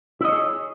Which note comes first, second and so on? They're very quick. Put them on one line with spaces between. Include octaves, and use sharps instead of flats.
E4 D#5 C#5 G#4